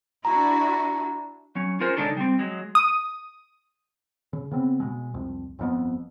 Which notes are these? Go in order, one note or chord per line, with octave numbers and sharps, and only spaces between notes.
D4 E4 F#4 A#5
F#3 C#4
C#4 F4 G#4 A#4 C5
C#3 G#3 D4 D#4 A4
G3 C4
F#3 G#3
D#6
C#3
C#3 B3 C4
B2 G#3
C2 F2
G1 F2 B3